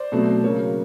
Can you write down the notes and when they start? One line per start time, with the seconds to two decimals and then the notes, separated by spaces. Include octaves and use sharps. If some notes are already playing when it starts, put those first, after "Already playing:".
Already playing: C5 D5
0.12 B2 F#3 A3 C4
0.44 C#3 F#3 A#3 C#5